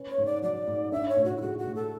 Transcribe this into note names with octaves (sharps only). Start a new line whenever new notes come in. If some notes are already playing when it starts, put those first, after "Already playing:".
Already playing: C#4 B4
C#5
G#2
D5
F#3 D5
G#2
D4 E5
C#5
A2
F#4
E4
G#3 F#4
F#4
A2
A4